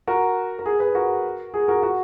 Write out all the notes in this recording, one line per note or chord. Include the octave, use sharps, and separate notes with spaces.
F#4 A#4
A#4
G#4
G#4 B4
F#4 A#4
G#4
F#4 A#4
F#4